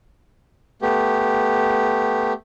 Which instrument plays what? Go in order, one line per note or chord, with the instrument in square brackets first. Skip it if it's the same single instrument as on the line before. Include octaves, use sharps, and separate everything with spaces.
[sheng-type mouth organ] A3 B3 G4